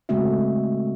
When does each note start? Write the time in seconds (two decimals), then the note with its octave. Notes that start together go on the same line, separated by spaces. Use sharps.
0.09 C#3 G#3 A3 C4 F#4 E5